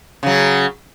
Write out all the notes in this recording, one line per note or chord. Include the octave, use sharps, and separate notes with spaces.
C#3 F#3